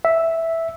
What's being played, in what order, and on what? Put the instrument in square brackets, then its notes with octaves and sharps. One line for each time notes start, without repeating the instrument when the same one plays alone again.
[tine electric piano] E5